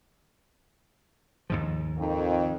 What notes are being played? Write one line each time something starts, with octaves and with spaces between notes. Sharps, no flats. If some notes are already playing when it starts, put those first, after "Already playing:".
D#2 G#2 F3
F2 D#3